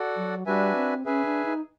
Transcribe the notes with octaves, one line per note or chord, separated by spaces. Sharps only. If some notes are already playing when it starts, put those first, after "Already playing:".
Already playing: F#4 A4 D5 F#5
F#3
G3 D4 F#4 B4 E5 G#5
C4
C#4 G#4 B4 E5 G#5
D4
D#4